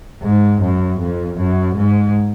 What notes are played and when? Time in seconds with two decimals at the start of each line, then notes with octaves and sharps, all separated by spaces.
0.23 G#2
0.61 F#2
0.99 F2
1.38 F#2
1.76 G#2